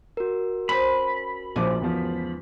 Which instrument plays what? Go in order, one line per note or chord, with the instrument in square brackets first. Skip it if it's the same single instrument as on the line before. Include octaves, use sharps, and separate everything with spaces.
[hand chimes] F#4 A#4
[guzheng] C#4 C5 D#5 [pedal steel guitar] B5
[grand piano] A#1 F3 D6 [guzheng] G#2 C#3 G#5
[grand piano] E2 F3